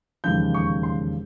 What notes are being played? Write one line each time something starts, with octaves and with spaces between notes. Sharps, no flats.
E1 D#2 C#3 F3 G6
C#6
C6